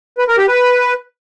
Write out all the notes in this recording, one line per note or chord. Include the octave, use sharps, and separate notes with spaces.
B4
A#4
G4
B4